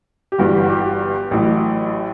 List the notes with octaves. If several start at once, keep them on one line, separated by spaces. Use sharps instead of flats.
G4
G1 G2 E3 G3 F#4
G4
F#4
G4
A1 A2 F#3